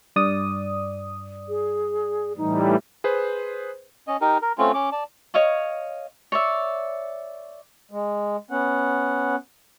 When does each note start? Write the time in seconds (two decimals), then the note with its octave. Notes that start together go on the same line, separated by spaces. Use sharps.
0.16 G2 D5 D#6
1.48 G#4
2.38 A2 E3 G3 D#4
3.04 G#4 B4 C5
4.08 C#4 D#5
4.21 D#4 G4 A#4
4.42 A#4
4.58 A3 C4 C#4 F4
4.74 C#4 D6
4.92 D5 A5
5.34 C#5 D#5 F5 C#6
6.32 C#5 D5 E5
7.91 G#3
8.51 B3 C#4 F#5